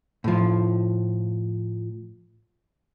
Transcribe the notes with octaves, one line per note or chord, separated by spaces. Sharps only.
A2 F3